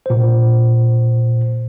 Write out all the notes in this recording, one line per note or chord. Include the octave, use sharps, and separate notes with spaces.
A#2 C5